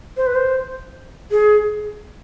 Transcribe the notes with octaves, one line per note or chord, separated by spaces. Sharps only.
C5
B4
C5
G#4